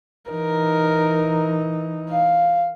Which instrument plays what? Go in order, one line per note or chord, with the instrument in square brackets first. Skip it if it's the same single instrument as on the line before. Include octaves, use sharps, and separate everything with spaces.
[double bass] E3 D#4 [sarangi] A#4
[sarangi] F5